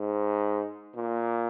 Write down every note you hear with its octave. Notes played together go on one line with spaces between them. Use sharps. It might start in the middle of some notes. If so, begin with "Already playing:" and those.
Already playing: G#2
A#2